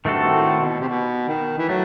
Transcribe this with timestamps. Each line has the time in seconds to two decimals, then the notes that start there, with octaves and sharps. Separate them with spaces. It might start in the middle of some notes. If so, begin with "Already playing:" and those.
0.05 G2 D#3 A3 C4 F#4 A4
0.32 A2
0.60 B2
0.80 C3
0.88 B2
1.28 D#3
1.58 E3
1.69 F#3 A3